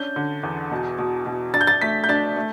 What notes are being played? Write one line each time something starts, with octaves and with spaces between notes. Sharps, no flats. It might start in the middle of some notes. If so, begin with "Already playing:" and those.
Already playing: C#4 D4 G6
D3
E2
B2
B2
B2
D4 A6
G6
A6
A3 B6
G6
D4 A6
A3